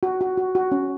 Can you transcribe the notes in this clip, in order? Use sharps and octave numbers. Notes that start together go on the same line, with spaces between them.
F#4
F#4
F#4
F#4
C#4